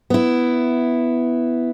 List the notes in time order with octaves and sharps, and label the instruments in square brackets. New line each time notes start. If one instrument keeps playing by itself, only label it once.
[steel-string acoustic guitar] B3 E4